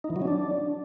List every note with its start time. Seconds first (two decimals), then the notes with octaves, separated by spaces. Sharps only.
0.04 D#4
0.10 E3
0.16 F#3
0.22 C#4
0.28 D4